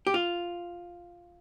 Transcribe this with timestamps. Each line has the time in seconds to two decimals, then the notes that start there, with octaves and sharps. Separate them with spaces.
0.07 G4
0.14 F4